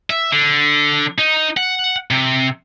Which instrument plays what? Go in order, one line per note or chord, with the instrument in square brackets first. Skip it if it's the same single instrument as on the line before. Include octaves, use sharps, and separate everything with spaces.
[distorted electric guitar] E5
D3
D#4
F#5
C3